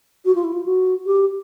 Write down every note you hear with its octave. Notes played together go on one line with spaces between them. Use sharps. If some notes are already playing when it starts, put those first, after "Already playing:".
F#4
F4
E4
F4
F#4
G4